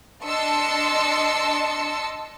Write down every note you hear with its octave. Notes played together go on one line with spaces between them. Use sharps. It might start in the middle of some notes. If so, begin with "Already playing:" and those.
D4 D#5 A5 C6 E6 C#7